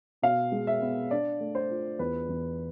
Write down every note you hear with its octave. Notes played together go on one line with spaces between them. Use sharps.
B2 F5
G#3
E5
B3
D4 D5
A3
C5
F4
E2 B4
E2